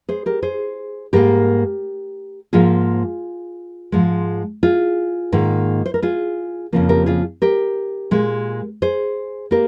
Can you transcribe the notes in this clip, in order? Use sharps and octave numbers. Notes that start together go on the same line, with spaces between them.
G#4 C5
G4 A#4
G#4 C5
G#2 G3 A#3 G4 A#4
G#2 F3 A#3 F4 G#4
G#2 F3 G#3
F4 G#4
G#2 D#3 A#3
C5
A#4
F4 G#4
F2 C#3 F3 A#3
G4 A#4
F4 G#4
G4 A#4
A#2 G#3
G#4 C5
A#3 G4 A#4